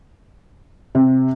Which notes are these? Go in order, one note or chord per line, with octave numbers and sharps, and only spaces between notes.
C3